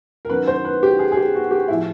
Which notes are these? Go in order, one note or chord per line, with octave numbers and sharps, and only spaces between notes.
A#4
F#2 D#3 F#3 B4
C5
B4
G4
G#4
G#4
G4
F#4
G4
A2 F3 E4